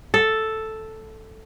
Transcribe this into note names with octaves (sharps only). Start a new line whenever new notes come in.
A4